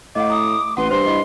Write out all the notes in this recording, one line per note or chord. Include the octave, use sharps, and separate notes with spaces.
A2 D#5 F5 F#5 D6
A#5 D#6
A1 B4 F#5 C6
G2 C5 C6
E4 D#5